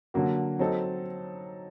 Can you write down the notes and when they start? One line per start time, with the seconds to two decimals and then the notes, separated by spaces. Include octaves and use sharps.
0.14 D3 F#3 A#3 F#4
0.59 F#3 C4 D#4 A4